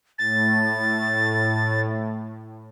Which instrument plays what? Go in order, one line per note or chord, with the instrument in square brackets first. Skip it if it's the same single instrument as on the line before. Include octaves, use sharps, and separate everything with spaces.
[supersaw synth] A2 [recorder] A6